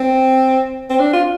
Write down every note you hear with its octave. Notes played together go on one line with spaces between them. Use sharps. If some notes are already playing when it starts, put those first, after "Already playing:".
Already playing: C4
C4
D4
F4